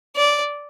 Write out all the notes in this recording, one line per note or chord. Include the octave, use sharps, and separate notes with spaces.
D5